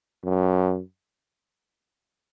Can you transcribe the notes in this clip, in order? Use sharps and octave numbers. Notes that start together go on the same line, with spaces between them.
F#2